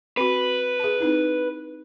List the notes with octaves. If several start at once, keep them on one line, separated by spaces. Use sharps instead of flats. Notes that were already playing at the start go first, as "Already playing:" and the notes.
C4 F#4 B4
G#4 A5
C4 D#4 E4